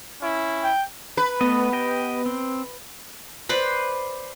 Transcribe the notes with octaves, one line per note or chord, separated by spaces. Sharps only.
C#4 E4
G5
B4
A3 B3 D#5
G4 D#5 G5
C4
B4 C5 D5 B5